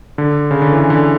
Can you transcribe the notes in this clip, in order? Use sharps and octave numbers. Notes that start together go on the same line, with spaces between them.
D3
C#3
D3
E3
D3